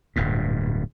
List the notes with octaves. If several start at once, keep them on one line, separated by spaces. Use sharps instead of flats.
D1 G2 A#2